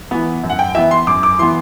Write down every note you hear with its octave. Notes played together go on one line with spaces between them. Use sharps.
E3 B3
F#2
F#5
G5
E3 B3 E5
C6
F#2 D6
D6
E3 B3 C6